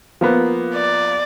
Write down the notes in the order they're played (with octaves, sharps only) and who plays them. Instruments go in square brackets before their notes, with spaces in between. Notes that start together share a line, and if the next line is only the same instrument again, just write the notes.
[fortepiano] F3 A#3 B3
[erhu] D5